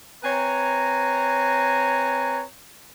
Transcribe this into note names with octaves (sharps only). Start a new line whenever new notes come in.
C4 B4 C#5 G#5 A#5